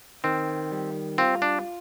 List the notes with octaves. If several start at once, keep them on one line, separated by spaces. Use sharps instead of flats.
D#3 C4
G3
C4 F4
D4